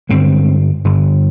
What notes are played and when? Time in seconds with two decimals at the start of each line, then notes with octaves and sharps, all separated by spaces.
0.09 G2 D3 G#3 C4
0.85 G2 D3